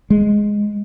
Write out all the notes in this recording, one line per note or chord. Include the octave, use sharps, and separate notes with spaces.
G#3